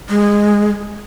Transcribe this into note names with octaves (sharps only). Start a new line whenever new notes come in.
G#3